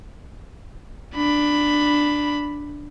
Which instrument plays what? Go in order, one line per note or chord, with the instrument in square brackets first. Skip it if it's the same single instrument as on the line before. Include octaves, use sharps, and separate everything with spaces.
[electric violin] D4 B5